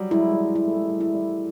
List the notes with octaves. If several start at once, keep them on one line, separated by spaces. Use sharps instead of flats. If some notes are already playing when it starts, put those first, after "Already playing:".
Already playing: F#3 G3
F#3 G#3 E4
G#3
G3
F#3 E4
A3
G#3
G3
E4
G3